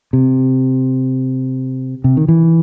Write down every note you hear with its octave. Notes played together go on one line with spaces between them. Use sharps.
C3
C3
D#3
E3